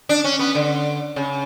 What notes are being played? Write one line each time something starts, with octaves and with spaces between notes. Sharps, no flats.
D4
C#4
B3
D3
C#3